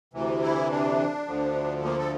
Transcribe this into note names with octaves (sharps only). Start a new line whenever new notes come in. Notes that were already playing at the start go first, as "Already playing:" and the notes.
D2 C3 E3
E4
D4
D2 D3 F3
A#3
A4